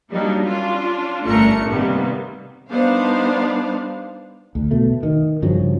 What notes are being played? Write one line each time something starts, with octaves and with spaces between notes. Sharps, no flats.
F#3 G3 A#3 D4 D#4
C#4 D4 F4
G1 A3 C#4 D4 A#4 C#7
C3 D#3 G3 A#3 B3
G3 B3 D4 D#4 C5 F5
D2
B2 A3
D#3
G2 C#3 F3 F#3